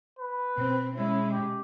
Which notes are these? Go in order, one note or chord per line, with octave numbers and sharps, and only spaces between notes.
B4
B2 C4
G#3 C#4 E4
G4